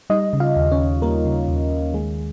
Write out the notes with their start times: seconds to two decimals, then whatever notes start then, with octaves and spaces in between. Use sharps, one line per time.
0.10 G3 D#4 D#5
0.33 C#3
0.40 F4 F5
0.56 D#2
0.72 C#4 C#5
0.79 D#2
1.02 G3 A#3 A#4
1.25 C#3
1.48 D#2
1.71 D#2
1.94 D#3 G#3 G#4